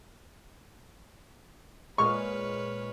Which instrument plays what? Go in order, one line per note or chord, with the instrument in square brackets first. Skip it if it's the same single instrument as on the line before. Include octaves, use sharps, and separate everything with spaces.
[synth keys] A#2 G#3 F6 [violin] B4 C#5 [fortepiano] C#6